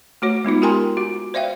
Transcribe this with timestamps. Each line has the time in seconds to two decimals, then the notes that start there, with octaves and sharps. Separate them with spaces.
0.22 A3 F#4 C#5
0.45 G#3 B3 D#4 F4
0.62 G4 A#4 G5 G#5 A#5 C6
0.97 F#4
1.34 C5 D5 E5 F5 G5